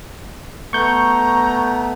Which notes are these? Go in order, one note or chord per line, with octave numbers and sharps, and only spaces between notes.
A3 B3 A#5 C#6 G6